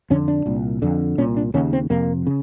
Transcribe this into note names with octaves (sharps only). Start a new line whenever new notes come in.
F2 D3 C#4
D4
C2 A#2
F2 D3
C2 A#2 C#4
D4
D#2 C#3 C#4
C4
F2 C3 A#3
C#3